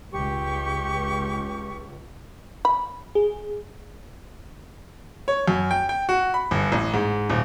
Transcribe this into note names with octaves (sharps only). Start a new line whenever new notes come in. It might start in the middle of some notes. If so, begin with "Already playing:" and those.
C#2 G4 C#6
B5
G#4
C#5
F#2
G5
G5
F#4
B5
G1
A1
G#2
D#1